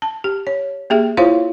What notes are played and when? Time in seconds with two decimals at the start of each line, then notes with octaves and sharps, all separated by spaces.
0.02 A5
0.24 G4
0.47 C#5
0.90 A#3 G4 G#4 E5 G5
1.17 E4 F4 C5 C#5 F5 C6